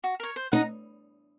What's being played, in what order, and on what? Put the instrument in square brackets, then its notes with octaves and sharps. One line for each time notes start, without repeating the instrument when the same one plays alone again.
[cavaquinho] F#4
A#4 C#5
C5
[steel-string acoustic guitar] D#4 [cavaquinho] F#5
[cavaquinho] A#5